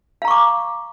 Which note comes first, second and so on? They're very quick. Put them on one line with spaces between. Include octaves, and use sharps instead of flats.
F5 A#5 C#6 D6